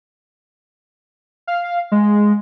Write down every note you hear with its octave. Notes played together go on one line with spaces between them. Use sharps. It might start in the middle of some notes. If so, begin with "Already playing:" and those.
F5
G#3